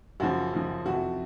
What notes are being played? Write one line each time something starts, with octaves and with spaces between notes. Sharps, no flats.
F#2 C#3 F3 F#4
F#2 C#3 F3
F2 C3 E3 F#4